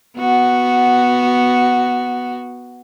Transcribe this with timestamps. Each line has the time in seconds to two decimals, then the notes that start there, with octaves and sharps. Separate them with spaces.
0.17 B3 F#4